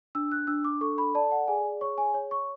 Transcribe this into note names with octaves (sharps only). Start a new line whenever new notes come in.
D4 E6
F#6
D4 E6
D6
A4 C#6
B5
D5 A5
F#5
G#4 G#5
C#5 C#6
G#5
C#5
C#6